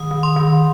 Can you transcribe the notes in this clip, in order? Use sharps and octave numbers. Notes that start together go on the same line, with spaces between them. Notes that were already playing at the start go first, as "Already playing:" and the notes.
Already playing: D#3 D#6
D#3
C6
D#3